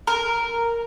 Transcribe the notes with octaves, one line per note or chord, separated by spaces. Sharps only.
A#4